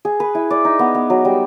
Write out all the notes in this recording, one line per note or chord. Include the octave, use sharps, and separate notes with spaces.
G#4
B4
E4
D5
D#4
B3
B3
F#3
G3